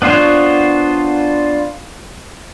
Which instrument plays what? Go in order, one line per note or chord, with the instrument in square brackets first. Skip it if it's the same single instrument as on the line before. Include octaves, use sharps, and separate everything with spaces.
[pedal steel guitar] B3 D4 F4 C5 C#5